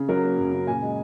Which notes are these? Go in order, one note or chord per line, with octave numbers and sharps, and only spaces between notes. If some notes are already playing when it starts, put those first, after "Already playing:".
Already playing: C#3
F#3 A#4
A#3
F#2
C#3
A#2 G#5
G#3